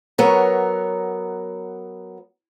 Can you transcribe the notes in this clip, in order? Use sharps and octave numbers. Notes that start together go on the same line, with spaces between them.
F#3 B3 A#4 C#5